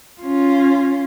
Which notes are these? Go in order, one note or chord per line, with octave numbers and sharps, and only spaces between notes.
C#4 F4